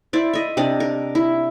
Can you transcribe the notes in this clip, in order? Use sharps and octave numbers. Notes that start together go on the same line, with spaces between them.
E4 C5 D5
D#5 E5
C3 D4 D#5
A#4
E4